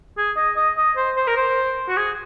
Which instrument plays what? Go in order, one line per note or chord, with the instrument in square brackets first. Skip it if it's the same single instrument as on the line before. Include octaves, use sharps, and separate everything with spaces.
[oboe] G#4
D#5
D#5
D#5
C5
C5
A#4
C5
F#4
G#4